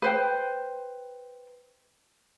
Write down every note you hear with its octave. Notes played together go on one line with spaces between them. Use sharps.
B4 C5 G5